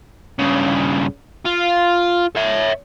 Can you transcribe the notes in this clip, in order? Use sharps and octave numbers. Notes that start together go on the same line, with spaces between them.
G2 C#3
F4
C#5 E5